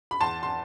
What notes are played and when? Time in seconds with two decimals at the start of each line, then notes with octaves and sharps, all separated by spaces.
0.11 B5
0.20 E2 A5 C6
0.43 C6